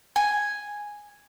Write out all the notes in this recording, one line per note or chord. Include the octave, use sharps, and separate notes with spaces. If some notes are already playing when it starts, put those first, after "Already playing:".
G#5